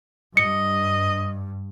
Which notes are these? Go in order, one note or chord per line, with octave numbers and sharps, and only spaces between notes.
G2 D#5 C#7